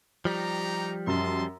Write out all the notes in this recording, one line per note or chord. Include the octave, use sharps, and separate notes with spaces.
F3 G3 D#4 G4 A#5
F#2 D#5 A5 C6